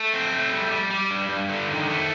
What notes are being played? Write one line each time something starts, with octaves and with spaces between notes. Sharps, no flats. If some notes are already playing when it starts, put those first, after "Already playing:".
Already playing: A3
C4
A3
G3
G3
G3
G2
G2
D3
D#3
A3